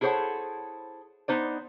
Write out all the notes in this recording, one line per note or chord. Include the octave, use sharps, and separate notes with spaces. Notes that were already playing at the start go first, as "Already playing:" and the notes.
E4 G#4 A4 C5 C#5 F#5
B3 D#4 C5 D5